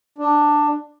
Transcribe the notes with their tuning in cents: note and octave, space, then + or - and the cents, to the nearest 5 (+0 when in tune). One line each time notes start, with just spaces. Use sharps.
D4 +10